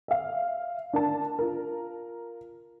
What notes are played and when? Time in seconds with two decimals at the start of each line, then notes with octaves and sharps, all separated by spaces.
0.08 E5 F5
0.93 D4 A#4 A5
1.39 F4 A#4